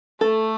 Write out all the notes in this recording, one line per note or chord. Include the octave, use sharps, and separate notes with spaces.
A3 A4